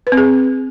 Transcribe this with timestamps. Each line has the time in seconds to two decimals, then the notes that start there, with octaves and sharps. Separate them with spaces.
0.07 B4
0.12 C4
0.17 G#4